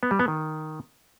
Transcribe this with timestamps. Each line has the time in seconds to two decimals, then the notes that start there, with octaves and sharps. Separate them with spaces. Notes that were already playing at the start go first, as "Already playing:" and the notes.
0.03 B3
0.11 G3
0.19 B3
0.28 D#3